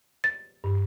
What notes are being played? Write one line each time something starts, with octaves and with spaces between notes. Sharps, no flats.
A6
G2